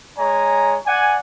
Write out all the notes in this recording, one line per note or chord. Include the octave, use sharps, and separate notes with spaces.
G#3 C#5 G#5 A#5
D5 F#5 G#5